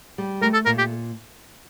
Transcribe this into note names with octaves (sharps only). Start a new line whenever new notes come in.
G3
A3 A#4
A4
A#2 A#4
G4